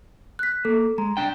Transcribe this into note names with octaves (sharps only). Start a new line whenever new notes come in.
F#6 B6
A#3 A4
G#3 A#5
C2 D4 G5